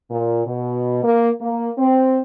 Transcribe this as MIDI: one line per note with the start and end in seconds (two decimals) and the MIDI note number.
0.10 0.42 46
0.46 1.02 47
1.03 1.29 58
1.40 1.70 58
1.78 2.20 60